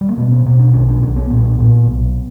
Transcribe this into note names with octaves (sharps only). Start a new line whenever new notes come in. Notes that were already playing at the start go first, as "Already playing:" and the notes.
G3
A#3
B2 B3
C#4
B2 C#4
D4
B1 C#4
D4
B1 C#4
B3
A#2 B3
A#2
B1